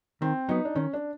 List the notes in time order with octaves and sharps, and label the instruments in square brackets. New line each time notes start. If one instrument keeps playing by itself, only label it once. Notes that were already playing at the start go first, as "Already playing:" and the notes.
[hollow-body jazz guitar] D#3 [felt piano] C4
[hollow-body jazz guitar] F#3 B3 [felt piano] D#4
[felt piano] D4
[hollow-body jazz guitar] D#3 [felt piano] C#4
[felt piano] D4